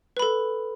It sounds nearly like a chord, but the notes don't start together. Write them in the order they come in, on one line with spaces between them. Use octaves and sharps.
B4 B5 A4